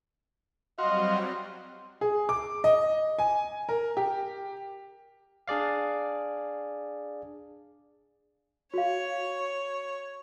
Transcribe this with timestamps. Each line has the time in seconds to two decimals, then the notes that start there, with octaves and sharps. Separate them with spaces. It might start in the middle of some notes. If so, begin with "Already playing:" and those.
0.78 F#3 G3 C4 F#4 D#5 F5 C6
2.01 G#4
2.29 D6
2.64 D#5
3.19 G#5
3.69 A#4
3.97 G4
5.48 D4 G#4 D5 F5
8.74 F#4 C#5 F5